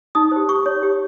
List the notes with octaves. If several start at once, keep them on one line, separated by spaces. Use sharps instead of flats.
D#4 D#6
G4 C5
G4 C#6
C#5
G4